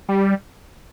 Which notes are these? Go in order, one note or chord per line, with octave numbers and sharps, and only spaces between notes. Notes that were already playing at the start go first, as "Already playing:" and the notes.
G3